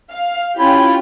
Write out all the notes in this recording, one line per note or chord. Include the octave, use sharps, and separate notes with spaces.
F5
C#4 E4 F4 G4